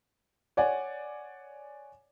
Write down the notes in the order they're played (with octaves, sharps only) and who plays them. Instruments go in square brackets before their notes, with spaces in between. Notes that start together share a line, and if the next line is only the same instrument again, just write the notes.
[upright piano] C#5 D5 F#5 G#5